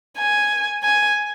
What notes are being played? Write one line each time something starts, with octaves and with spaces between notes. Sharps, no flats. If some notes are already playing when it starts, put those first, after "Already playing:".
G#5
G#5